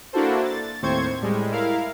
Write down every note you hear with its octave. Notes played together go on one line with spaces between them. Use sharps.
A#3 D4 E4 F#4 A4 C5
A6
D#2 A2 C4 C5 C#6 G#6
A2 G3 G#3
E4 A#4 F5